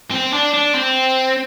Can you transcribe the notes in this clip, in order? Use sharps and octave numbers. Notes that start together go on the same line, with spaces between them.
C4
D4
D4
C4